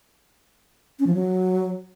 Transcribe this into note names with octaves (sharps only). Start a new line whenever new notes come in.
C#4
F3
F#3